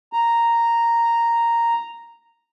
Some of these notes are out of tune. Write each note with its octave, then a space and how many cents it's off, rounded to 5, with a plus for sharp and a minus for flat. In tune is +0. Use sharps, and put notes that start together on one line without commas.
A#5 -5